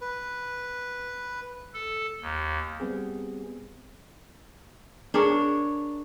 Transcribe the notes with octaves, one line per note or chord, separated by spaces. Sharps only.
B4
A4
D#2
G3 B3 C4 G#4
D4 G#4 A#4 C#5